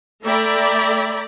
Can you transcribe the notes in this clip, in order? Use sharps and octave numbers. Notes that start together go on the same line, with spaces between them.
A3 D5 E5 G5 A#5 B5